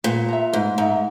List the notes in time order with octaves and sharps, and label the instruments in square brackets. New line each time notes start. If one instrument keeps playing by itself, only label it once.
[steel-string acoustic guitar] A#2 [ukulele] B4
[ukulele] E5 A#5
[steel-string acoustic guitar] G#2 [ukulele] B4
[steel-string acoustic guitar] G#2 [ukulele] E5 A#5